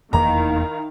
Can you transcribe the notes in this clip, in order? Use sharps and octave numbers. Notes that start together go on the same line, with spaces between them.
F1 E2 D#3 A#3 E4 F5 A#5